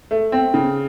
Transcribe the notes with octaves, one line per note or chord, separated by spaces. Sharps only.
A3
C4
C#3